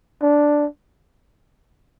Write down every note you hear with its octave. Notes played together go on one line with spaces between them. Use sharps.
D4